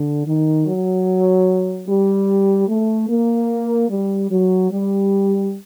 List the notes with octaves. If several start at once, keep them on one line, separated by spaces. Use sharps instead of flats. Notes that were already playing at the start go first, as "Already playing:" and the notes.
Already playing: D3
D#3
F#3
G3
A3
A#3
G3
F#3
G3